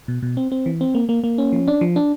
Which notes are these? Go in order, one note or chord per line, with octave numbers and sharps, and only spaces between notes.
B2
B2
C4
C4
E3
C4
A#3
A#3
A#3
C#4
F3
D4
F3
D4